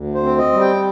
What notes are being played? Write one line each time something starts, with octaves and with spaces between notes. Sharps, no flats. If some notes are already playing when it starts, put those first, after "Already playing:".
Already playing: D2
C5
C4
D#5
G3
G5